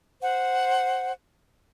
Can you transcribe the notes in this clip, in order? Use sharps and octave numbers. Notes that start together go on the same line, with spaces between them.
C5 F#5